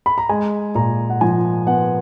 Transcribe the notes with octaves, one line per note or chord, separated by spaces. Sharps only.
B5
A#5
G#3 G#5
A#2 A#5
F#5
F3 G#5
B3 F#5